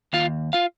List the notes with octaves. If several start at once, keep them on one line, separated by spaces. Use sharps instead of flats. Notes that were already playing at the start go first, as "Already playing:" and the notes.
D#2 F4 F5
F4 F5